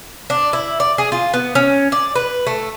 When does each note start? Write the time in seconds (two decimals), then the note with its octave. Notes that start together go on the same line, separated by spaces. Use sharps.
0.30 D4
0.53 E4
0.80 D5
0.98 G#4
1.12 F4
1.34 B3
1.55 C#4
1.92 D5
2.15 B4
2.47 A3